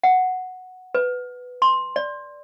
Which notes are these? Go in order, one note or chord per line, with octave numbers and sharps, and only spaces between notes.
F#5
B4
C6
D5